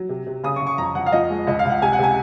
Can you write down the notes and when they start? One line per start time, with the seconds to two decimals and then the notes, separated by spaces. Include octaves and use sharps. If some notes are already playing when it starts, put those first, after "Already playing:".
Already playing: F#3
0.09 C3
0.27 C3
0.44 C#3 D#6
0.56 C#6
0.61 C#3
0.67 C#6
0.78 F2 A#5
0.95 F2 F#5
1.06 F5
1.12 F3 D#5
1.30 G#3
1.47 C#2 D#5
1.59 F5
1.65 C#2
1.70 F#5
1.82 C3 G#5
1.93 F#5
1.99 C3 G#5